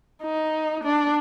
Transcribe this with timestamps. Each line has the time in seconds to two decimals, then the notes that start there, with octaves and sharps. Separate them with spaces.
0.23 D#4
0.83 D4